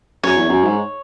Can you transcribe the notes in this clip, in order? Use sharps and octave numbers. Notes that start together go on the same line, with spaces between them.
F#2 C#5
E2
F#2
G#2